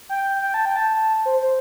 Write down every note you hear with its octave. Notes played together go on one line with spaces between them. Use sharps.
G5
G5
A5
G5
A5
C5
C5